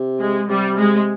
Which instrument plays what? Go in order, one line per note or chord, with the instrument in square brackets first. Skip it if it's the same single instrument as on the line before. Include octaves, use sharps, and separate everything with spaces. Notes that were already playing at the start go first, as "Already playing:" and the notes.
Already playing: [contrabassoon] C3
[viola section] G#3
[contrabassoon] C3 [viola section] G3
[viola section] G#3